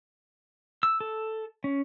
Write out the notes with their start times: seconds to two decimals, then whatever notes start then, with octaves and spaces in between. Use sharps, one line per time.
0.83 E6
1.00 A4
1.64 C#4